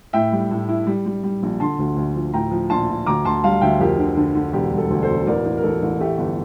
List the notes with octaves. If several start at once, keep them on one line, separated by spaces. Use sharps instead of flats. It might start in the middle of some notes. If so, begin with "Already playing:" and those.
A2 E5 G5
G3
A2
E4
G3
G3
G3
A#1
D3 A5 C6
D2
D2
F3
A2 G5 A#5
F3
A#1 A5 C6
F3
D2 A#5 D6
D2 A5 C6
G3 F5 A5
D2 E5 G5
F2 G4 A#4
D3
D3
D3
E1 G4
G3
A4
D2
A4 C5
E1
A1 A#4 D5
A1
A#4
A1 A4
A1
A3 G4
G1